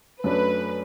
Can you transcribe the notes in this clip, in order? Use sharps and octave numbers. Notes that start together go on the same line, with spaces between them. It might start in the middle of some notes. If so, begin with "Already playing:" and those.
F#2 F#3 A3 D4 B4